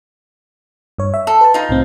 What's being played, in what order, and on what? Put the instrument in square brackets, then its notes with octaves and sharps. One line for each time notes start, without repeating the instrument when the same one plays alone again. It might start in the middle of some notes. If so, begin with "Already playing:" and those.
[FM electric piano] G2 C#5
E5
[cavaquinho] A4
[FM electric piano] B4 A5
[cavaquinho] D#4 F4 [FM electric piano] D#5
[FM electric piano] C2 A2 C4